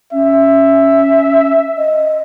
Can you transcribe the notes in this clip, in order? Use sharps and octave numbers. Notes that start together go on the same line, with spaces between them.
C#4 E5
D#5